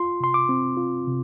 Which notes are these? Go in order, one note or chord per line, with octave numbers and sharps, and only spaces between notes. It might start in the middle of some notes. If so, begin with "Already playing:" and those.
Already playing: F4 C6
C3 C6
D6
C4
F4
C3